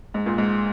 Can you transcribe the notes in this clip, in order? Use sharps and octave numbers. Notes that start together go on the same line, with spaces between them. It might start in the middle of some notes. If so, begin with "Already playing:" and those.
G#2
A#2
G#2